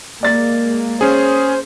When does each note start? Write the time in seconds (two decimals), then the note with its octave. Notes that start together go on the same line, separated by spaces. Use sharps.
0.23 G#3 A#3 D5 A6
1.01 C#4 G#4 C5